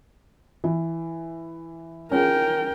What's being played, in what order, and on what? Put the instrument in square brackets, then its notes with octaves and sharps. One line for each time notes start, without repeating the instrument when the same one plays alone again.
[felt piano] E3
[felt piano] C#4 F4 G#4 [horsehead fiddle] A#4 G5